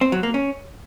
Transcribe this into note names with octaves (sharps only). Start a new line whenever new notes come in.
C4
F#3
A#3
C#4